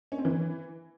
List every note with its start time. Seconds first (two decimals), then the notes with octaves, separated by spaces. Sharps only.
0.12 C#4
0.18 C4
0.25 E3